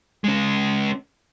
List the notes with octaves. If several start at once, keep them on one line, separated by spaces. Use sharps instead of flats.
G#3 C#4